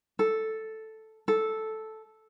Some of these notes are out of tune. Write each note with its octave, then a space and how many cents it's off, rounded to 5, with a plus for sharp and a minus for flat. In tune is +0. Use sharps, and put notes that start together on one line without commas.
A4 +0
A4 -5